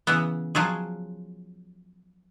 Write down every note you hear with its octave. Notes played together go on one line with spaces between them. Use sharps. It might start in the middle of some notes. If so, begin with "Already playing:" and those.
C#3 E3 B3
F3 F#3 F4 G#4